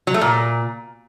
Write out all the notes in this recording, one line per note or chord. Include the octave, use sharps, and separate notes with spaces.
F#3
A3
A#2